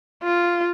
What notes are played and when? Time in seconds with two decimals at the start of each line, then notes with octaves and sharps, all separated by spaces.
0.23 F4